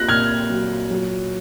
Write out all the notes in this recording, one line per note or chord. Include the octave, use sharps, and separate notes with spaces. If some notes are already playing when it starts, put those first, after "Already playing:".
Already playing: A#3 F4 F#6 A#6
A#2 F6 G#6
F#3
F#3